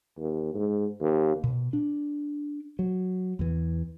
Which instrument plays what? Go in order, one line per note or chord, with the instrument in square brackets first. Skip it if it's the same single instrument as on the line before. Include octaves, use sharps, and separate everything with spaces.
[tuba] D#2
G#2
D#2
[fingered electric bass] B2
D4
F#3
E2 E3